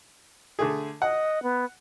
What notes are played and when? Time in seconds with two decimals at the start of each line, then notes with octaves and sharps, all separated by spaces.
0.59 D3 A3 G#4
1.02 D#5 F#5
1.43 B3